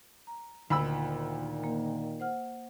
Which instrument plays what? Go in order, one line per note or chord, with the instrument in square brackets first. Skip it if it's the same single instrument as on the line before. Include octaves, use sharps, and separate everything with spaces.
[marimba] A#5
[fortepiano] D2 B5 E6 [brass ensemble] A#2 D#3
[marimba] A#3
C5 F#5 F6